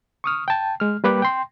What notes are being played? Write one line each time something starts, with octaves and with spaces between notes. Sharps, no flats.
C#6 D#6 F6
G5 A5
G#3 F6
G3 A#3 B4 G5 D6 F#6
G5 C6